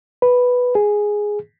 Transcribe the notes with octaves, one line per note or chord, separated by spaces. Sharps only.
B4
G#4